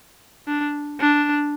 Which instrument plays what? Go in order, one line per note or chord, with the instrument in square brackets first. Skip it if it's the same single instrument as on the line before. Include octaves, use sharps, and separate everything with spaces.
[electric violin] D4
D4